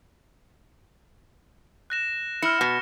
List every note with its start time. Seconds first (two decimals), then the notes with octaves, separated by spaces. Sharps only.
1.90 F#6 A#6 E7
2.42 E4 F6 C#7
2.61 B2